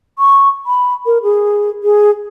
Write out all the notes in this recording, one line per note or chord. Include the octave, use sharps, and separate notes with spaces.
C#6
B5
A#4
G#4
G#4